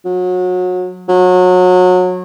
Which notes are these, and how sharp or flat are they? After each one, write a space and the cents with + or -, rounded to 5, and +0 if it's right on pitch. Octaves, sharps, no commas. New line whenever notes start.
F#3 -30
F#3 -25